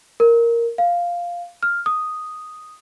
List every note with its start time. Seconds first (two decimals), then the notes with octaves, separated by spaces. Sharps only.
0.20 A#4
0.78 F5
1.63 F6
1.86 D#6